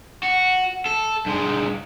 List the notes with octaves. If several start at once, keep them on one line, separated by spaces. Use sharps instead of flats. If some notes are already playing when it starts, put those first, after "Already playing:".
F#4
A4
G2 G#3